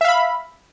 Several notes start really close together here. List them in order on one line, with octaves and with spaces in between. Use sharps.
E5 F5 B5